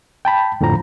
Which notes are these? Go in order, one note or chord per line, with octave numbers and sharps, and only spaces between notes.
G5 A5 B5
F2 A2 D3 F3 A#5